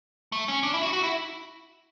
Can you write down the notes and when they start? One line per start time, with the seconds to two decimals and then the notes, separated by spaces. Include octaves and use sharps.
0.32 A3
0.48 C#4
0.63 D4
0.74 E4
0.83 F#4
0.93 F#4
1.03 E4